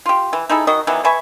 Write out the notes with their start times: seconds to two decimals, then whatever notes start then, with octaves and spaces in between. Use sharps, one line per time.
0.06 F4 G4
0.33 E3
0.49 D#4 E4 G#4 A4
0.67 D#3 F#4 D#5
0.87 D#3 E3 F#3 B3
1.05 B4 E5 G#5 C#6